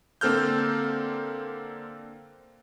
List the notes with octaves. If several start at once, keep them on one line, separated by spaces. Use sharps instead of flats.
D3 A#3 C4 A4 F6 G6